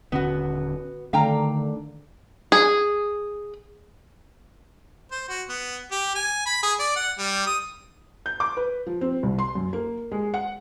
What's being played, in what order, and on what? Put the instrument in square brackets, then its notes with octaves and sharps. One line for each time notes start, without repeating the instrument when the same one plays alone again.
[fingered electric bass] D#1 D3 C#4 [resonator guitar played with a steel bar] B3 F#4
[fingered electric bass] D3 [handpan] D#3 A3 D4 [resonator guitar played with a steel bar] F5 G5 A#5
[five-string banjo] G#4
[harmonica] C5
F#4
B3
G4
G#5
B5
G#4
D5
F#5
G3
D#6
[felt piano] G6
D6
B4
F3
C4
C2
C6
F#2
A#3
G#3
F#5